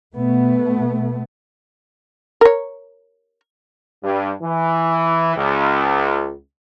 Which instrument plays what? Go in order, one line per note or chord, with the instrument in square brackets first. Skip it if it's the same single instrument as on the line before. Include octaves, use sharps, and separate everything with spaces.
[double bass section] B2 A3 B3
[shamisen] A#4 C#5
[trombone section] G2
E3
C#2